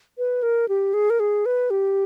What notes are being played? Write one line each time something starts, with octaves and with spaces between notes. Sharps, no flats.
B4
A#4
G4
G#4
A#4
G#4
B4
G4